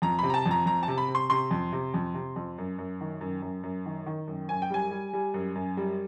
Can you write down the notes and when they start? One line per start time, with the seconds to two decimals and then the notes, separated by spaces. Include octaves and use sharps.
0.02 F2 A#5
0.19 C3 B5
0.30 A#5
0.34 A5
0.46 F2
0.51 A#5
0.66 F2 A#5
0.83 A5
0.88 C3
0.98 B5
1.08 C3
1.15 C6
1.30 C3 C6
1.51 F2
1.72 C3
1.94 F2
2.15 C3
2.36 F2
2.58 F#2
2.78 F#2
3.01 D#3
3.21 F#2
3.42 F#2
3.63 F#2
3.86 D#3
4.06 D#3
4.27 F#2
4.49 F#2 G#5
4.62 G5
4.70 G3 G#5
4.91 G3
5.13 G3
5.34 F#2
5.55 F#2
5.77 G3